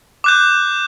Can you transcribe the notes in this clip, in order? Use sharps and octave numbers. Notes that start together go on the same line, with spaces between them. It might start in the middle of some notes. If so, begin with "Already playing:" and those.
D6 F#6 G6